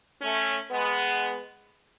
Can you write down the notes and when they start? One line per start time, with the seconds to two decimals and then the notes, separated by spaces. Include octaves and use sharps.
0.22 A3 C#4
0.71 G#3 B3